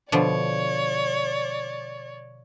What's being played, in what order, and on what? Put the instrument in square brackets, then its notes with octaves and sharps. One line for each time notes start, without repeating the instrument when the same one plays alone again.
[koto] B2 D3 F3 [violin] C#5 D5